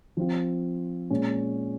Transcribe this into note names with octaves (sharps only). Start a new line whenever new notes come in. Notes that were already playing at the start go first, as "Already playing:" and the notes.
F3 C4 F4
A#2 G#3 C#4